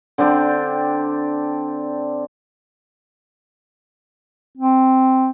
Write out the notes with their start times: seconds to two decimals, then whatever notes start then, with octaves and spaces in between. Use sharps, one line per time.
0.18 D3 C4 D4 G5
4.58 C4